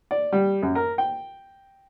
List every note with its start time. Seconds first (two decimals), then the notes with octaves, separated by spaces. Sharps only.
0.11 D5
0.32 G3
0.62 F#2
0.75 A#4
0.98 G5